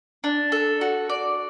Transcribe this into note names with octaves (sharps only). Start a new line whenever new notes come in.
D4
A4
F#4
D5